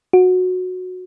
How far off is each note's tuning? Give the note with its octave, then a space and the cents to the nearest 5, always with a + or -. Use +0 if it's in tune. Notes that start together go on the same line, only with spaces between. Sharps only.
F#4 -15